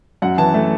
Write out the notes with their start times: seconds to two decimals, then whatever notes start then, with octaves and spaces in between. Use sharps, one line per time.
0.22 F#2 F#5
0.38 E3 A5
0.54 A3